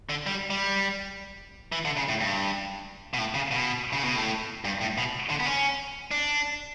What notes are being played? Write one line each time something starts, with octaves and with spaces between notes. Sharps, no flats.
D3
G3
G3
E3
D3
C#3
A2
G2
B2
A2
C#3
B2
C#3
B2
A2
G2
A2
B2
D3
B3
C#4
D4